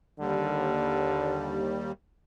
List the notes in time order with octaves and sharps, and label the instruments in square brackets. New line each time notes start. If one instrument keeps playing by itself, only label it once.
[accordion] D#2 G3 [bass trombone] D3